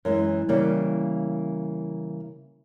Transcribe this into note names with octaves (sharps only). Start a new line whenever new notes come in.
F#2 E3 G#3
C#3 E3 G3 A#3